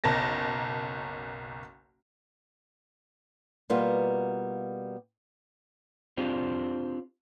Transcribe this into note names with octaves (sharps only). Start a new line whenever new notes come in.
F#1 B1 A#4 A5 A#6
B2 G3 A#3 B3 F4
C4 D4 F4 G4 G#4 C5